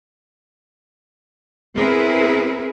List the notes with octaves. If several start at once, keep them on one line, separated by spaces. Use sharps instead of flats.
B3 C4 E4 G#4 A#4 B4